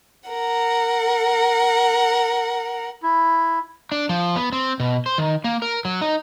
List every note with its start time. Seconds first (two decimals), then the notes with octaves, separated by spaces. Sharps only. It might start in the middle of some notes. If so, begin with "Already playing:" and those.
0.30 A#4 F#5
3.02 E4
3.92 D4
4.09 F3
4.36 B3
4.53 C4
4.80 B2
5.06 C5
5.18 D#3
5.44 A#3
5.62 A#4
5.85 F#3
6.02 D#4